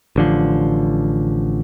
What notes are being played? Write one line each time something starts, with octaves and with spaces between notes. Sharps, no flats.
A1 D3 F3